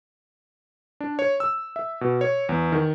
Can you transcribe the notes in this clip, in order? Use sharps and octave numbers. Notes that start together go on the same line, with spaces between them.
D4
C#5
E6
E5
B2
C#5
E2
D#3